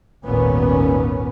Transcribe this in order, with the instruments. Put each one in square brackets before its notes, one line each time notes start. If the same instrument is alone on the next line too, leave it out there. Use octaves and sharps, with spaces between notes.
[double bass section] G#1 D#2 A#2 B3 C#4